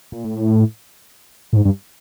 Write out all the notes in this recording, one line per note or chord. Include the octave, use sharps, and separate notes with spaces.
A#2
A2
A2
G#2
G2